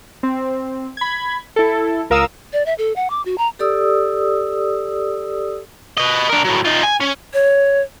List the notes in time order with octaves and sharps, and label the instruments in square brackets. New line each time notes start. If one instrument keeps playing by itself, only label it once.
[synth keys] C4
B5 G#6
E4 A4
C#2 A#4 F5 D#6 E6
[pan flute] D5
E5
A4
F#5
D6
F#4
A#5
[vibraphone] G4 A4 D5 D#6 E6
[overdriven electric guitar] B4 D#5
D4 A#4
A2 F#3
D#4 F4
G#5
C#4
[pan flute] C#5